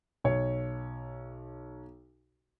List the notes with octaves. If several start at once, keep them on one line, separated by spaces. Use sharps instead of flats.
B1 C#5